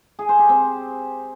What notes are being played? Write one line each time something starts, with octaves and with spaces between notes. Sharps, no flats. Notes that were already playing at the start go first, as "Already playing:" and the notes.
G#4
C5
G4
C4